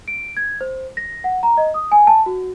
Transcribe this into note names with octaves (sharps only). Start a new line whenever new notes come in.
D7
G#6
C5
A#6
F#5
A#5
D#5
D#6
G#5
A5
F#4